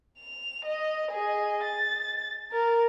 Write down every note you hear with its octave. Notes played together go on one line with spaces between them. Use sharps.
F7
D#5
G#4 D#5
A6
A#4